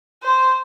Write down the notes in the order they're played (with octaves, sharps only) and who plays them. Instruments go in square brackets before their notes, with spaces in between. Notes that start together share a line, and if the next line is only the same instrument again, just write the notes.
[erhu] C5